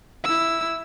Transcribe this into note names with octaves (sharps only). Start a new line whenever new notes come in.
E4 E6